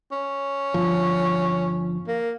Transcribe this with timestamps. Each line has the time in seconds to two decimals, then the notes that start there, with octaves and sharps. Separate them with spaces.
0.12 C#4
0.74 G1 F3
2.08 A#3